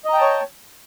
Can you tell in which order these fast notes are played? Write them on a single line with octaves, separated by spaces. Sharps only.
D#5 A#5 G5 A5 C#5